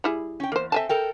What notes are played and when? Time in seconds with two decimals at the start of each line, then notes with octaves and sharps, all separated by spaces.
0.04 G3 E4 G#4
0.40 C#4 G5
0.52 E2 A#3 C5
0.72 C4 A4 E5 G#5 A5
0.89 A4 A#4 G5